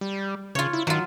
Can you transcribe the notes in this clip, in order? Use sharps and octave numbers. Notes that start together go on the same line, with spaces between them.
G3
C#3 F4 C#5
E4
D#3 F#3 F4